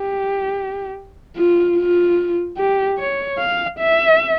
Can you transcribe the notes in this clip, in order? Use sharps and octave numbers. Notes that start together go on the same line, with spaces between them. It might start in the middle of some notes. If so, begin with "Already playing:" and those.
Already playing: G4
F4
F4
G4
C#5
F5
E5